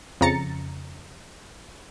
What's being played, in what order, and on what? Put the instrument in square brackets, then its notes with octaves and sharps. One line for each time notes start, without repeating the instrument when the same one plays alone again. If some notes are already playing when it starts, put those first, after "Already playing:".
[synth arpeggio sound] F2 C#3 A#5 A6 C#7